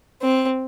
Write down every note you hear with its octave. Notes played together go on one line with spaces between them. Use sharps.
C4